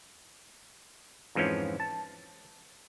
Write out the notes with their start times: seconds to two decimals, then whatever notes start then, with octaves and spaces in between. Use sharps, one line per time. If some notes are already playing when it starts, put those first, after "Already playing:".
1.35 F2 G#2 E3 F3 C#4
1.80 A5